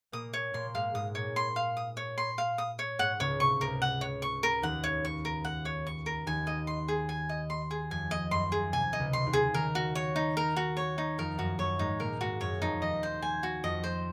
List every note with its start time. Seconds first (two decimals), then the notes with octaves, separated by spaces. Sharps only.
0.12 A#2 A#3 D#6
0.33 C#5
0.53 A#2 A#3 C6
0.74 G#2 G#3 F5
0.94 G#2 G#3 D#6
1.15 A#2 A#3 C#5
1.36 C6
1.56 F5
1.77 D#6
1.97 C#5
2.18 C6
2.38 F5
2.58 D#6
2.79 C#5
2.99 G#2 G#3 F#5
3.20 C#2 C#3 C#5
3.40 C3 C#6
3.61 C#2 C#3 A#4
3.82 F#5
4.01 C#5
4.22 C#6
4.43 A#4
4.62 D#2 D#3 F#5
4.84 C#5
5.05 C#6
5.25 A#4
5.45 F#5
5.65 C#5
5.87 C#6
6.06 A#4
6.26 D#2 D#3 G#5
6.47 D#5
6.67 C6
6.88 G#4
7.09 G#5
7.29 D#5
7.50 C6
7.71 G#4
7.91 F2 F3 G#5
8.11 D#5
8.31 F#2 F#3 C6
8.52 G#4
8.72 C3 G#5
8.93 D#5
8.99 C#2 C#3
9.13 C6
9.27 D#2 D#3
9.33 G#4
9.54 D#2 D#3 A#4
9.75 F#4
9.95 C#5
10.16 D#4
10.37 A#4
10.56 F#4
10.77 C#5
10.98 D#4
11.18 F2 F3 A#4
11.38 F#2 F#3 F#4
11.58 F#2 F#3 C#5
11.79 G#2 G#3 D#4
12.00 A#2 A#3 A#4
12.20 G#2 G#3 F#4
12.40 F#2 F#3 C#5
12.62 F2 F3 D#4
12.81 D#2 D#3 D#5
13.03 C5
13.22 G#5
13.43 F#4
13.63 F2 F3 D#5
13.84 C5